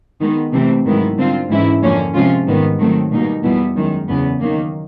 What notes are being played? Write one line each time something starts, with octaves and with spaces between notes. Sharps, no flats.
D#3 G#3 B3 D#4
C3 E3 A3 C4
G#2 D#3 F#3 B3 E4
D3 G3 C4 F4
G#2 E3 G#3 C#4 E4
F2 D3 F3 A#3 C#4
C3 F3 G#3 C#4 F4
G#2 D#3 G3 B3
D#3 F#3 A3 C4
B2 G3 A#3 D#4
E2 B2 G3 B3 E4
F#2 D#3 G#3
E2 C#3 F#3 B3
D#3 F#3 A#3